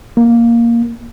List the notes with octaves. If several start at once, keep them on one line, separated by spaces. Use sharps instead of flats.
A#3